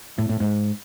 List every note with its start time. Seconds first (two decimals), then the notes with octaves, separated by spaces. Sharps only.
0.18 A2
0.29 A2
0.40 G#2